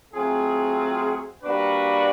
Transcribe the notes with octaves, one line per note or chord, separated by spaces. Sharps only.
F#3 A3 C4 F4 G#4
G3 A#3 D4 F#4 B4